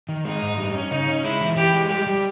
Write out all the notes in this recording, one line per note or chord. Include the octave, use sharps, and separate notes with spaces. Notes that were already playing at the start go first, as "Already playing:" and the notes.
D#3
G#3 D#4
G#2
G3
C#4
C#3 D#4
C#4
G#3 E4
E3
E3 G4
G#3
G3 G4
G3